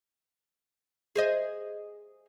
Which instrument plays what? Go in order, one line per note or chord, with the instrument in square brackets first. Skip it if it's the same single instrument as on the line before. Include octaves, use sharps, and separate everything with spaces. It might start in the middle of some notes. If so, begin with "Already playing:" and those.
[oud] G#4 C5 D#5